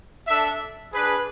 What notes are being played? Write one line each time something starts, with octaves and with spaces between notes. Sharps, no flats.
D4 A4 E5
D4 G#4 B4